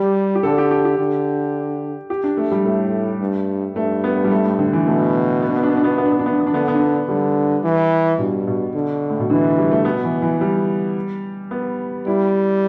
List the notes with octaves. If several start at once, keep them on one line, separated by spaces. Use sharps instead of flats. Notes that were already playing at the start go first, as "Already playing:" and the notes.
Already playing: G3 G4
G4
D3 A4
G4
G4
G4
D3
G4
D4
A3
G3
A2 A3
G2
G2 A3
B3
G3
A3
A2
D3
E3
B2 A3
B3
D4
B3
D4
B3
D4
B3
D4
B3
D4
B3
D4
B3
D4
B3
D4
D3 B3
D4
B3
D4
B3
D3 G3
E3
G2 B2
B2
D3
A2
B2
D3 E3
G3
A3
B2 B3
E3
E3
G3
B3
G3 E4